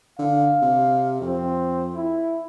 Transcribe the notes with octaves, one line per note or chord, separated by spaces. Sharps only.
D3 F5
C3
F2 C4
E4